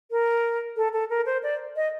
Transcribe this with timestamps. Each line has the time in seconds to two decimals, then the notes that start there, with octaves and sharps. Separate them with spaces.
0.11 A#4
0.77 A4
0.93 A4
1.10 A#4
1.26 C5
1.43 D5
1.76 D#5